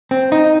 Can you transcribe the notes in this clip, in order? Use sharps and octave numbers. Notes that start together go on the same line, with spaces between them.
C4
D#4